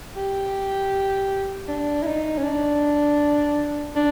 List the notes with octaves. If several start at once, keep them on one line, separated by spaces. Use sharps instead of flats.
G4
D4
E4
D#4
C#4
D4
D4